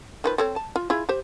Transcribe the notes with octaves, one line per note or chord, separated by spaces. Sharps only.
D#3 F3 B4
C4 A4 C#5
A5
F4
E4 F4 G#4
G4 C5